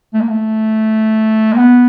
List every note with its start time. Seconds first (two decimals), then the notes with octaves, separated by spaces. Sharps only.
0.13 A3
0.21 A#3
0.28 A3
1.53 A#3
1.57 B3